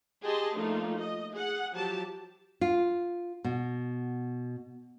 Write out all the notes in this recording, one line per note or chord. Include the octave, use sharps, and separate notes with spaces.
G4 G#4 D#5 A5 C6
F3 A3 A#3 D4 D#4 F4
D#5
G#4 F#5
F3 F#3 G4 A5
F4
B2